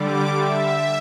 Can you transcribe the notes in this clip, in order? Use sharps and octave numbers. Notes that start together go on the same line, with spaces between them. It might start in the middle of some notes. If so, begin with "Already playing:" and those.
Already playing: D3 G3 D6
E5